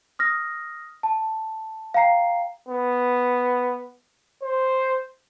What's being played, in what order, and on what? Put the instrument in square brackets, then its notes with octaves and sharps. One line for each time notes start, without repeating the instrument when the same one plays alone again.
[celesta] D#6 F6 A#6
A5
F5 G5 A#5 C7
[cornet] B3
C5